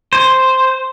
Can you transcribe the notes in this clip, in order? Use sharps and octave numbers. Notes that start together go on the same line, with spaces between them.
C5